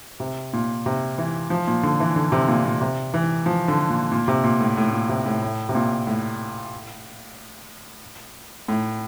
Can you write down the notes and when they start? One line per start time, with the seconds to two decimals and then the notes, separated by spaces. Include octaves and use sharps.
0.20 C3
0.53 A#2
0.86 C3
1.18 E3
1.50 F3
1.67 A#2
1.83 D3
2.00 E3
2.16 D3
2.32 C3
2.48 A#2
2.65 A#2
2.81 C3
3.14 E3
3.46 F3
3.68 D3
3.89 A#2
4.12 A#2
4.28 C3
4.44 A#2
4.60 A2
4.77 A2
4.93 A#2
5.09 C3
5.26 A2
5.42 A2
5.69 C3
5.75 A#2
6.07 A2
8.68 A2